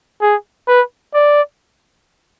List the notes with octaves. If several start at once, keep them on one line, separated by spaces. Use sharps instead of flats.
G#4
B4
D5